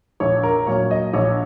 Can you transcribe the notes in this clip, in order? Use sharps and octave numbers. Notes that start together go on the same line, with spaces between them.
A#1 C#5
A#4
A#2 F#3 C#5
D#5
A#1 C#5